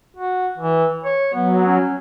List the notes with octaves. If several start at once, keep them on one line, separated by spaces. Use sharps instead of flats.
F#4
E3
C#5
F#3 B3
C#4